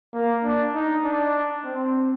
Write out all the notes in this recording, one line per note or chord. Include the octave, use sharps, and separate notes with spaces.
A#3
D4
D#4
D4
C4